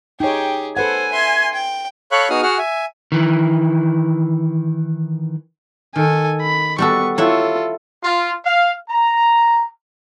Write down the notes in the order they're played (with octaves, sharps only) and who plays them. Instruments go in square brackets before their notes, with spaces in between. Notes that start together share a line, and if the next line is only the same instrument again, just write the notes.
[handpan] D#4 C#5 [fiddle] G4 G#4 [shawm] G5
[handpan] A4 B4 F#5 [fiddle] C5 [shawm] G#5
[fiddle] E5 C6
G5
[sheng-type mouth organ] A4 C#5 F5 B5 C#6 F#6
B3 D#4 F#4 G#4 D#6 F6
F#4 G#4 F#5 F6
E5 G#5
[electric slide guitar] D#3 E3
[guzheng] D#3 [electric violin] A4 G#5
[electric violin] B5
[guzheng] G3 F#4 A4 [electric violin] B3 C#6
[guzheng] E4 C#5 F#5 [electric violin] F4 A4
[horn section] F4
F5
A#5